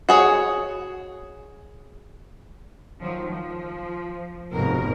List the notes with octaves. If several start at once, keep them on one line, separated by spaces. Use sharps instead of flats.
F#4 G#4 C#5
D#3 F3 F#3
F3
F1 G#2 B2 A#4